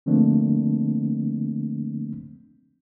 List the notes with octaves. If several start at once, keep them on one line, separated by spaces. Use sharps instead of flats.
D3 F3 A3 A#3 C4 D4